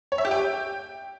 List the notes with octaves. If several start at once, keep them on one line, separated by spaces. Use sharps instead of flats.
C#5
E5
G4
G5